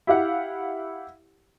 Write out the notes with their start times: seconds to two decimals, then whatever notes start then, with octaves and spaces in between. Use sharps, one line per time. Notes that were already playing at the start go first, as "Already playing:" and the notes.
0.07 E4 G4 F5 F#5